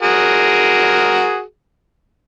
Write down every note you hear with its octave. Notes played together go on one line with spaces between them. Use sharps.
F#4 G#4 A#4